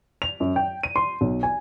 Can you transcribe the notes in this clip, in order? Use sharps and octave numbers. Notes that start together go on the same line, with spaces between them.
F7
F#2
G5
D#7
C6
B1
G#5